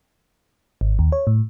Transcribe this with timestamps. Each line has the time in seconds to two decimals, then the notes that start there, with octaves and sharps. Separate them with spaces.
0.81 G#1
0.99 D#2
1.12 C#5
1.27 A2